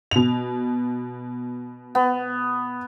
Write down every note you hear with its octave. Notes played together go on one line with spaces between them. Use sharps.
B2 F7
B3